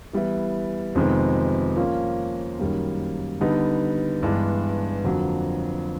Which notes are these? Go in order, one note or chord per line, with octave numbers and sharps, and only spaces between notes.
E3 G3 B3 E4
F2 C3 D#3 G#3 B3
F3 A#3 C#4 F4
F#2 D#3 G3 A#3
D3 G3 B3 D#4
G2 E3 G#3 B3 D4
F2 D3 F#3 A#3